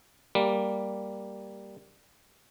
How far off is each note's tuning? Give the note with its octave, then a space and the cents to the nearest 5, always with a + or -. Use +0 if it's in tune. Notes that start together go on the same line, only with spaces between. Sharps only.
G3 +0 A#3 +0